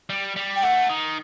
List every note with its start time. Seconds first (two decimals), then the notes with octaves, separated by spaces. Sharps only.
0.10 G3
0.36 G3
0.56 G5
0.63 A3 F#5
0.89 D#3